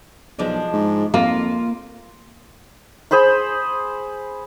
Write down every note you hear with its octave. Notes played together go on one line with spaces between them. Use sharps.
B1 F3 G#3 D4
G#2
F2 A#3 F4
G#4 C5 B5 C6